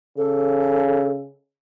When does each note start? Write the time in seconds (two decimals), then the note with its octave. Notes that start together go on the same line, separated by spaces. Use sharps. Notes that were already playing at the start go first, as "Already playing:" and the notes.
0.18 C#3 A4